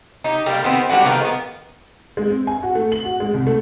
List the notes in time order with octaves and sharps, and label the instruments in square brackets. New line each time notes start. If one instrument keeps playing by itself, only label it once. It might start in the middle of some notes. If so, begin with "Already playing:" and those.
[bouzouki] D#4 G4
G3 A#3 F4
D#3 B3 C4
G3 D4 F#4 F#5
D#3 F3 A#3 B3
G#3 B3
[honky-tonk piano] G#3
C4
G#5
F#4
A3
F#7
F#4
G#3
C2
A3